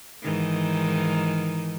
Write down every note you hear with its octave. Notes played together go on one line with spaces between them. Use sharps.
G#2 D#3 E3